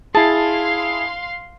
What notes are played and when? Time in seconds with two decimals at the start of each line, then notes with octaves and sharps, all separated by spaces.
0.15 E4 G#4 F5 A5 C6